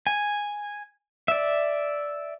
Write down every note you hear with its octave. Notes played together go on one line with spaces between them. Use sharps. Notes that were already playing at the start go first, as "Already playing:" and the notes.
G#5
D5 E5